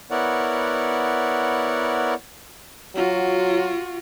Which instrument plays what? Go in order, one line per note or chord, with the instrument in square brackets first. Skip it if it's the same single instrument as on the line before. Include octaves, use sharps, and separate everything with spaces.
[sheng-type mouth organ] B3 E4 A#4 C#5 D5 F#5
[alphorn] F#3 [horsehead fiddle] F4 F#4